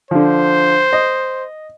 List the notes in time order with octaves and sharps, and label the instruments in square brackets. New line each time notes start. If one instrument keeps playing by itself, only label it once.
[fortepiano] D3 F3 [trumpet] C5
[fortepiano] D#5